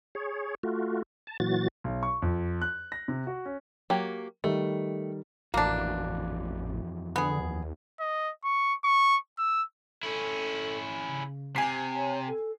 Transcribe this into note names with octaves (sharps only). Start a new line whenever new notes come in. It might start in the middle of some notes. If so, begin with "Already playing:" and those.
G#4 C#5
A3 F4 F#4
A5
A#2 E3 F#3 F#4 A6
B1
C#6
F2
F#6
A#6
C3
F#4
C#4
F#3 A#3 G4
D#3 G3 A3
A1 F2 E3 A#3 D4 F#4
D3 B3 G#4
D#2
D#5
C#6
C#6
E6
C#4 E4 A4
C#3
C3 G#5 C7
C#5
A4